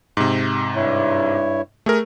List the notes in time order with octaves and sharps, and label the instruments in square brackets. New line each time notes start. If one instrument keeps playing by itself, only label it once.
[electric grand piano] G#2 C3
[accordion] G2 E4 C#5
[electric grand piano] A3 G#4 A#4